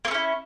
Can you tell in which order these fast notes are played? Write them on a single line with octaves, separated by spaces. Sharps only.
A#3 A3 C#4 E4